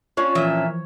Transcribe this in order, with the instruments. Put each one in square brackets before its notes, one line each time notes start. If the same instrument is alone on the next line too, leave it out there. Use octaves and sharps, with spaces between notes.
[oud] C#4 D4 F4 [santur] C#5
[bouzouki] A#2 E5 [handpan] E3 F3